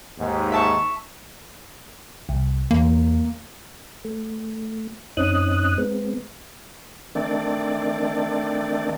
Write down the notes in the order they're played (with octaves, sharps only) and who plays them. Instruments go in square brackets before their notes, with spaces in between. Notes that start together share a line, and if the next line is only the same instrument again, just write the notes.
[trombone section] D#2 G#2
[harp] E5 A5 C#6
[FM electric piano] C2
[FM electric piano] E2 [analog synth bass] A#3
[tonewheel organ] A3
F#2 C4 C#4 D#4 D#6 F#6
G#3 B3 C4
D#3 A3 C4 D4 D5